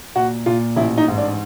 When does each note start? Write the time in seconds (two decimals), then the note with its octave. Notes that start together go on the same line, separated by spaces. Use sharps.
0.15 A#2 F#4
0.46 A#2 F4
0.76 A1 E4
0.98 D#4
1.08 G#2
1.18 D4